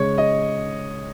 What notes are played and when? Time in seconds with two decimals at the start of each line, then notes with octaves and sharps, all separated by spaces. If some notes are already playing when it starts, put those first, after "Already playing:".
Already playing: C#3 G#3 C#5
0.18 D#5